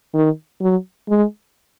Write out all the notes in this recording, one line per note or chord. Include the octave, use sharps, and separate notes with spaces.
D#3
F#3
G#3